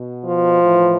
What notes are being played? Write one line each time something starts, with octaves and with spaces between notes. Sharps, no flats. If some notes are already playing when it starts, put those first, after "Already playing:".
Already playing: B2
F3
A2 E3